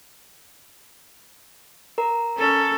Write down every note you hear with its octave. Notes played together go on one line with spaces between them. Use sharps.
A#4 A#5
C#4 A4